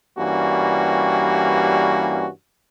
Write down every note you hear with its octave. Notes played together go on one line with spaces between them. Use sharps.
G2 E3 G3 A#3 C#4 F#4